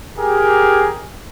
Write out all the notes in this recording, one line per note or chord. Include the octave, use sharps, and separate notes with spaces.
G4 G#4 A#4